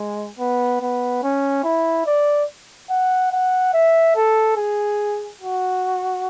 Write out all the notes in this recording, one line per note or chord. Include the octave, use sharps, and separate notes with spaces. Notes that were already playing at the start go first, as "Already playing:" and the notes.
Already playing: G#3
B3
B3
C#4
E4
D5
F#5
F#5
E5
A4
G#4
F#4